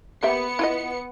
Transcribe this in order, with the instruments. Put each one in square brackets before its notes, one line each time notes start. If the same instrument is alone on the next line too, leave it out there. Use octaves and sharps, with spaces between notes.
[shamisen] A#3 G4 E5 [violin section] B3 C#7
[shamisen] E4 F4 D#5